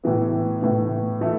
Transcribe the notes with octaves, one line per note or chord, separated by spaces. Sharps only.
A2 E3 B3
A2 E3 B3
E3 A3 E4